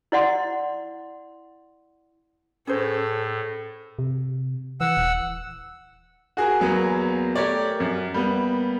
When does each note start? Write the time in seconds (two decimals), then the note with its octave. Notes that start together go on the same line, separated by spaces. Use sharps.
0.12 E4 D5 F#5 C6
2.67 A2 C#4 G#4 A4 C5
3.99 C3
4.81 E3 F#5 E6
4.97 D#1
6.37 F#4 G#4 A#4
6.60 E2 F#3 A#3 B3
7.35 A3 G4 A#4 C#5 D5
7.80 F#2
8.14 G3 A#3 B3